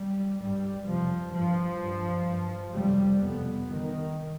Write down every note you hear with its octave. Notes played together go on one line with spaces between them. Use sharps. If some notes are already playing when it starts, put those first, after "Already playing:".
Already playing: G3
G2 G3
F2 C3 F3
G2 F3
G2
G2
F2 C3 G3
F2 C3 B3
G2 D#3